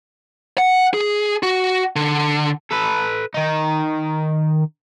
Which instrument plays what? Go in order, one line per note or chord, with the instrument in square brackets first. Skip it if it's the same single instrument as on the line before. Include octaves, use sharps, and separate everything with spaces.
[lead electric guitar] F#5
G#4
F#4
D3
[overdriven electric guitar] A4 B4
D#3 D#4